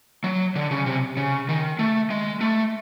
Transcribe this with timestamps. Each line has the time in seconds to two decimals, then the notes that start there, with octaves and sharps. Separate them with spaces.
0.24 F#3
0.56 D3
0.71 C#3
0.86 C3
1.17 C#3
1.49 D#3
1.79 A3
2.10 G#3
2.41 A3